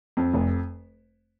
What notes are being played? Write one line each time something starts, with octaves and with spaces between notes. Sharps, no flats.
F2
F1